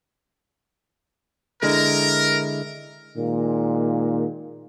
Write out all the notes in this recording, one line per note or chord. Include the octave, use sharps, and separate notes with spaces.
D3 G#3 E4 A#4
A#2 D#3 G#3 A#3